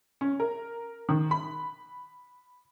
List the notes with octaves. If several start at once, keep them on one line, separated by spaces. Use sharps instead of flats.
C#4
A#4
D#3
B5